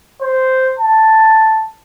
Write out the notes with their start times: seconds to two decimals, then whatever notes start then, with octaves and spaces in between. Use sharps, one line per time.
0.21 C5
0.79 A5